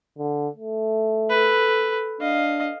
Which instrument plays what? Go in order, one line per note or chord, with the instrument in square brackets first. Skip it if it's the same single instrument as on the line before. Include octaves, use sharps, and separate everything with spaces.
[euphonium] D3
A3
[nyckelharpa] A4 B4
[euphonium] D4 [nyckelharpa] D#5 F5